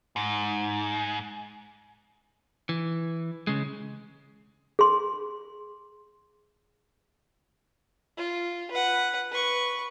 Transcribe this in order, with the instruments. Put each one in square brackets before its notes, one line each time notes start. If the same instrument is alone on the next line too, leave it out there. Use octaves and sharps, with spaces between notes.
[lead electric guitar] G#2
[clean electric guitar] E3
C#3 G#3
[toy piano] G#4 C6
[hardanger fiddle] F4
B4 F#5
B4 C#6